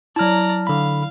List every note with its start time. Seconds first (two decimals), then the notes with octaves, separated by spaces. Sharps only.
0.16 F#3 E4 D5 A5 A#5 F6
0.67 D3 F5 B5